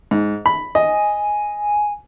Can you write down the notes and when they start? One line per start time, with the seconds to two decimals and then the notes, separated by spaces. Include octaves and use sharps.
0.11 G#2
0.46 B5
0.75 D#5 G#5